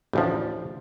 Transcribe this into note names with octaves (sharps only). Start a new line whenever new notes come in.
A1 D2 F3